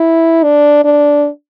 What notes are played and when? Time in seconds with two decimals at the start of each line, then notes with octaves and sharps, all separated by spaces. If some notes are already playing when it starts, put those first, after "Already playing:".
Already playing: E4
0.44 D4
0.85 D4